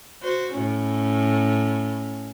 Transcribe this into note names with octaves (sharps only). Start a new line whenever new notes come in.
F#4 C5
A2 C#4